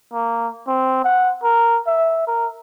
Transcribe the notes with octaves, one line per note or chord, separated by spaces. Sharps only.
A#3
C4
F#5
A#4
E5
A#4